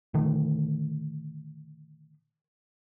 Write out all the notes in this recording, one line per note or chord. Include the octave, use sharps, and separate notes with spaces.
A#2 D3 D#3 A3